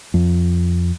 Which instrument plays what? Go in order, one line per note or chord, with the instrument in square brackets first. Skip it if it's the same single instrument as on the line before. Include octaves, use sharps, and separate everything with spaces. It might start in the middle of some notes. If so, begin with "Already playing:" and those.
[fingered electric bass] F2